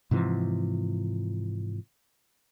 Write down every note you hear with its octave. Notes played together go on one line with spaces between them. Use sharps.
G#2 C3 E3 F3